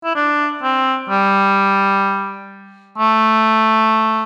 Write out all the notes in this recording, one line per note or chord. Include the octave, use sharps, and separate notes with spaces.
E4
D4
C4
G3
A3